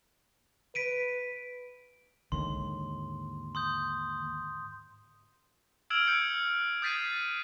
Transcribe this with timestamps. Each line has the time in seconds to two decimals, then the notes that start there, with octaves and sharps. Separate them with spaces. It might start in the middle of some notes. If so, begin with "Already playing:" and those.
0.75 B4 B6 D7 D#7
2.32 D#2 G#2 D3 C6
3.55 C6 D#6 G6
5.90 E6 F6 G#6 D7 E7 F#7
6.07 G6 G#6 C#7 D7
6.82 D#6 G6 A6 B6 C7 D#7